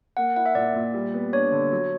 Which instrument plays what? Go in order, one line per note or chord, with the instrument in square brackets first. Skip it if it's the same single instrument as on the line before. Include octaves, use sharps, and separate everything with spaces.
[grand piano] A#3 [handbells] F#5
[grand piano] E4 [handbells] F#5
[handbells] E5
[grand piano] A#2 [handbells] D5
[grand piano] A#2
G3
B3
[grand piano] D4 [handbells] C#5
[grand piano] D3
F#3